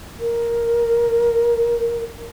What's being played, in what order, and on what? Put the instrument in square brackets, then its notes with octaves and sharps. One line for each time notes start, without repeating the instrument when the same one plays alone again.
[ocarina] A#4